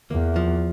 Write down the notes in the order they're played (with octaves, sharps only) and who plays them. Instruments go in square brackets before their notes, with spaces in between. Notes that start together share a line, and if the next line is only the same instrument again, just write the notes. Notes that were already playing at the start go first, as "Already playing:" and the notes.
[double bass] E2 [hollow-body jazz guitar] A#3
[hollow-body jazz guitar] F3